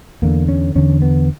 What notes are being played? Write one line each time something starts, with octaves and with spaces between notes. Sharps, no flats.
E2 D3 A#3
C#4
E2 D3 C#4
B3